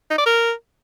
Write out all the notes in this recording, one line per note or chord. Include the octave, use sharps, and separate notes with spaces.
D#4
D5
A#4